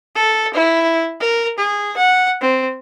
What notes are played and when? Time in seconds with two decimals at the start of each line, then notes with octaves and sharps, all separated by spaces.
0.15 A4
0.54 E4
1.20 A#4
1.58 G#4
1.97 F#5
2.41 C4